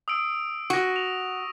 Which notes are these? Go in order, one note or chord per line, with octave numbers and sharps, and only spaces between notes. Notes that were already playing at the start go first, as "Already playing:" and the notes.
D#6 E6 D7
F#4 C#6 A#6
F7